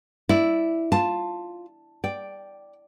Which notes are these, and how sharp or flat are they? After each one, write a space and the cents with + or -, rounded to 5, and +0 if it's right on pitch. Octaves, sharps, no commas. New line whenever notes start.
E4 +0 D5 +0
F4 +0 A5 +5
D5 +0 G5 +0